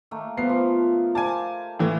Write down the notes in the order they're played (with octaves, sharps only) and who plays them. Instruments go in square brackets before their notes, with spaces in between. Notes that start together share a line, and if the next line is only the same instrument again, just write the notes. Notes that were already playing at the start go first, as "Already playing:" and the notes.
[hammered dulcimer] D#3 A3 A#3
[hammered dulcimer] F3 G3 F5 [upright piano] B3 C7
[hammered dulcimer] F3
[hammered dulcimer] G4 C5 F5 [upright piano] G#5 A5
[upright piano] A2 E3